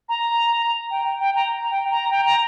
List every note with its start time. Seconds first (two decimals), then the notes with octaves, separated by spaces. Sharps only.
0.09 A#5
0.91 G5
1.20 G5
1.36 A#5
1.71 G5
1.91 A#5
2.11 G5
2.26 A#5